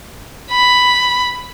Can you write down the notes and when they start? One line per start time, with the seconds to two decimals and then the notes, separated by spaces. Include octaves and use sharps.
0.51 B5